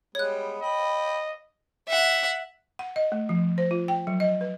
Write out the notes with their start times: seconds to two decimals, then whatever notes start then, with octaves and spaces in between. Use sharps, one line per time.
0.15 G3 G#3 B3 C#5 F#6
0.62 D#5 G5 B5
1.88 E5 F#5
2.79 F#5
2.96 D#5
3.12 A3
3.29 F3
3.58 C5
3.71 F4
3.88 G5
4.07 F#3
4.20 D#5
4.41 B4